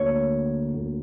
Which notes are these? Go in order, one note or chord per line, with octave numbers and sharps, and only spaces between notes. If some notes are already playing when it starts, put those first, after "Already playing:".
Already playing: D2 D3 A#3 C#5
D2 D3 A#3